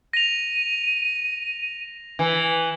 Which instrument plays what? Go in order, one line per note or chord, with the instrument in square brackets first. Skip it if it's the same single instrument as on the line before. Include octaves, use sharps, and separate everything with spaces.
[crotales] A#6 F7 [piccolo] D#7
[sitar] E3